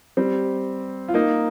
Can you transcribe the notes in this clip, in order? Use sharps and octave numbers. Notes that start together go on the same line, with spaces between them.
G3 C4
F4
A#3 D#4